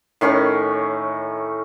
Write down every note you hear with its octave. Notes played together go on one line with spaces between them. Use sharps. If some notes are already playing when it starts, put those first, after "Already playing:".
A2 D#3 C#4 C#6